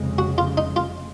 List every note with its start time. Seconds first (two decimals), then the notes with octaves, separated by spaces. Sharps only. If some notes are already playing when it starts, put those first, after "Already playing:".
Already playing: F1 F2 C#3 G#3
0.18 F#4
0.38 F4
0.57 D#4
0.76 F4